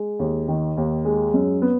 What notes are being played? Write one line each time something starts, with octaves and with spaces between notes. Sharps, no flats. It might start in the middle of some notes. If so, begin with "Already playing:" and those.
Already playing: G#3
D#2
D#3
D#2
G#3
F#2
B3